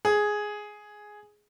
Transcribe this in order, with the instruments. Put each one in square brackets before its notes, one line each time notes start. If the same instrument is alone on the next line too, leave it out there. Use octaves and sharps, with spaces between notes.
[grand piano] G#4